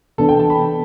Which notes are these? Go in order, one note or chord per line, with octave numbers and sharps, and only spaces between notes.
C3 E3 B3 D4 A4
G5
A5
B5